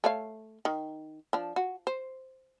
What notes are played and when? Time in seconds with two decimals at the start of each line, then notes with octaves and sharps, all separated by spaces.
0.04 A3 C#5 F5
0.65 D#3
1.33 F3 D4
1.56 F#4
1.87 C5